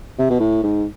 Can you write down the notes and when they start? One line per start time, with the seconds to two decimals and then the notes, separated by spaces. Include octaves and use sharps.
0.19 C3
0.30 B2
0.40 A2
0.63 G#2